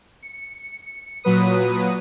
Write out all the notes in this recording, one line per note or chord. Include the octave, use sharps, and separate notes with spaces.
C#7
A#2 F#3 B4 D#6